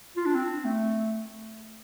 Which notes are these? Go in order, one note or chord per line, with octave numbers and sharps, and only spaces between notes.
F4
D4
C4
A3